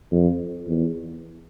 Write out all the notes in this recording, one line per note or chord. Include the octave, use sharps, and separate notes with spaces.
F2
E2